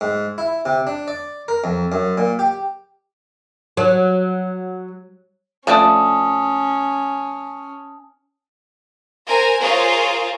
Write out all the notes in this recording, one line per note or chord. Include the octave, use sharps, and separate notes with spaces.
G#2
E4
C3
D4
D5
A#4
F2
F#2
A#2
G4
F#3
F3 A3 C#4 D4 A5 D#6
A#4 C5 G#5
F4 G#4 A#4 C5 C#5 F5